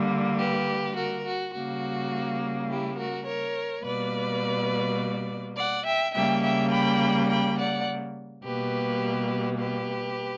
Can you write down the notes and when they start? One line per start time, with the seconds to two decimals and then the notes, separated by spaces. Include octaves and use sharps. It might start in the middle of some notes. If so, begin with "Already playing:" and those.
Already playing: D3 G3 A#3
0.39 G4 B4
0.96 F#4 A#4
1.25 F#4
1.54 C#3 G3 A#3 F#4
2.69 E4 G4
2.98 F#4 A#4
3.27 A#4 C#5
3.84 B2 G3 A#3 B4 D5
5.57 D5 F#5
5.86 E5 G5
6.14 C#3 G3 A#3 E5 G5
6.43 E5 G5
6.72 G5 B5
7.30 G5 B5
7.59 D5 F#5
8.45 B2 G3 A#3 G4 B4
9.59 G4 B4